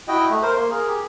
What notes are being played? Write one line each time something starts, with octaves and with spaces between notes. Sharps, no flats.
E4 F#4 D#5 G5
A3
A#4 C5
A#3 C6
G#4 A#4
G4 G#4